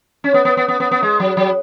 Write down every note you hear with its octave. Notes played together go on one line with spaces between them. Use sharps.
C#4
B3
B3
B3
B3
B3
B3
G#3
F#3
F#3